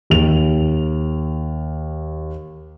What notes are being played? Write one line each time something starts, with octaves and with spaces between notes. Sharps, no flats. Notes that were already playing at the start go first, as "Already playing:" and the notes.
D#2 F7